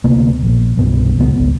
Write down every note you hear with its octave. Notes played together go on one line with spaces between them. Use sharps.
D2 C3 A#3 B3
A#1
C2 G2 B2 B3
D#1 C#2 C3 B3
D1 G#1 C#2